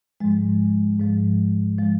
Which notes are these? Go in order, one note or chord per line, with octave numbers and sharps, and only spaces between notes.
G#2 F3 G#3
G#2 F3 G#3
F3 G#3